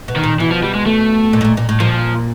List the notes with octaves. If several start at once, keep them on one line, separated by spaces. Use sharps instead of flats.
B2
D#3
A#2
B2 E3
F3
G3
G#3
A3
A#2
A2
A#2
A#2
A2
A#2 F3